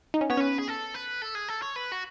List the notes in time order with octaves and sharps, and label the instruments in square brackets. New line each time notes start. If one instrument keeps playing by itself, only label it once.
[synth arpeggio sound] D#4
C#4
[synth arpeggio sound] B3 [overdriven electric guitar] C#5
[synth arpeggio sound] C#4 [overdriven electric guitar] B4
[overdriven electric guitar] G#4
A4
B4
A4
G#4
A4
C#5
B4
F#4